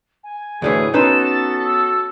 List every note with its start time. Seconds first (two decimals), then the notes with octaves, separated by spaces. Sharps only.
0.23 G#5
0.62 D2 A2 E3 G#4
0.94 B3 C#4 D#4 F#4 A4 B4 C6 E7
1.24 A6
1.65 E6